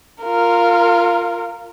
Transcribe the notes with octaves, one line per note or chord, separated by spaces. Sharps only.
F4 A#4